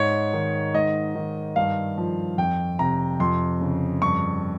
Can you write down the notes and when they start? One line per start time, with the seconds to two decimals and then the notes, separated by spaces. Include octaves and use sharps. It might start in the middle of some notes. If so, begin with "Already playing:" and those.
Already playing: G#2 C#5
0.34 D#3
0.74 G#2 D#5
1.15 D#3
1.56 G2 F5
1.98 F3
2.38 F2 G5
2.79 C3 A#5
3.20 F2 C6
3.61 C#3
4.02 G2 C#6